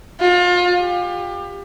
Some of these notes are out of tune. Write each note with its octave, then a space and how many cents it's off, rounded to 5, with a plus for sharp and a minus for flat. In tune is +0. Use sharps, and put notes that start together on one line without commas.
F4 +30
G4 +30